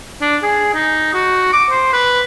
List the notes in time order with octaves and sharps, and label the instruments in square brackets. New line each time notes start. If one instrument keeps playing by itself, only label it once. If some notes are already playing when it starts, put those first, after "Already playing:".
[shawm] D4
G#4
D#4
F#4
D6
C5
B4